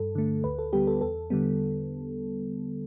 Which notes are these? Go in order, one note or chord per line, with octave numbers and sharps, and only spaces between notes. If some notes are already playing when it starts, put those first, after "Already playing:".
Already playing: G2 A4
D3 A3
D2 B4
A4
D3 G3 B3 G4
A4
E2 A4
D3 G3 B3